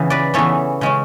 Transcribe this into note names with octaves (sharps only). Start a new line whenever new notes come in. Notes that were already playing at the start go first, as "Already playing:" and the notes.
Already playing: C#3 E3 B3
B4 D5
C#3 E3 B3 A4 C#5
C#3 G#3 C#4